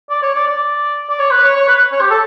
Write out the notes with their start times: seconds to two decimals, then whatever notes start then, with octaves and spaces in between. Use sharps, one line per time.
0.10 D5
0.22 C#5
0.35 D5
0.47 D5
1.10 D5
1.20 C#5
1.31 B4
1.43 C#5
1.55 C#5
1.68 B4
1.92 C#5
2.01 G4
2.10 A4